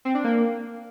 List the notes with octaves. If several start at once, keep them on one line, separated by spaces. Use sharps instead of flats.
C4
D4
A#3